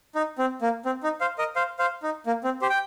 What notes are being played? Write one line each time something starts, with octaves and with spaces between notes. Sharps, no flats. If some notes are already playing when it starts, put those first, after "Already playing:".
D#4
C4
A#3
C4
D#4
C5 F5
A#4 D#5
C5 F5
C5 F5
D#4
A#3
C4
G4 C5
G5